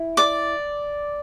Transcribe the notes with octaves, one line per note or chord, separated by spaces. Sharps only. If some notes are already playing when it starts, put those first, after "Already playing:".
Already playing: E4
D5 D6